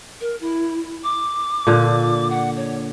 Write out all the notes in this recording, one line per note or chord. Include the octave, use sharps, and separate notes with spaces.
A#4
E4
D6
A#2 D3
F#5
C#5